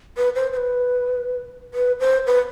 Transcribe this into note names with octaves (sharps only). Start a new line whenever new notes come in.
B4
C5
C5
B4
B4
C5
B4